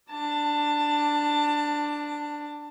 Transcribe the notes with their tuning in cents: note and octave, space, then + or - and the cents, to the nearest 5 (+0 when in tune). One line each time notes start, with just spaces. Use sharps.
D4 +0 A5 +20